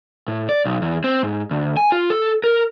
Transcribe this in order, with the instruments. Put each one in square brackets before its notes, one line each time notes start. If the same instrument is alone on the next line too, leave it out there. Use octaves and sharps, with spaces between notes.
[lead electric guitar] A2
D5
B1
E2
C4
G#2
D2
G#5
F4
A4
A#4